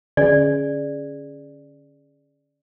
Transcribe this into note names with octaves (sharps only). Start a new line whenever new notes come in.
D3 C#4 G#4 D5